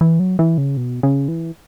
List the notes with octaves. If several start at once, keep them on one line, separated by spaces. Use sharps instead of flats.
E3
F#3
E3
C#3
B2
C#3
E3